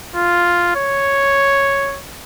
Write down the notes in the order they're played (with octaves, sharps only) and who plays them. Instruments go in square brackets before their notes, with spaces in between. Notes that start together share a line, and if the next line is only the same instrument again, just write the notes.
[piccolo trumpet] F4
C#5